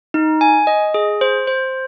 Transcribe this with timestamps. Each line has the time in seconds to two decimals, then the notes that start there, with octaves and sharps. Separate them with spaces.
0.14 D#4
0.41 G#5
0.67 D#5
0.94 G#4
1.21 C5
1.47 C5